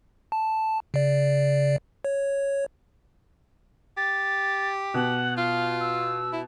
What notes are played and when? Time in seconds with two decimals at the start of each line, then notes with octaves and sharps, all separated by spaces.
0.32 A5
0.94 C#3 D5
2.05 C#5
3.97 G4 A6
4.94 B2 F#5
5.38 F4 F5
5.81 E6
6.33 E4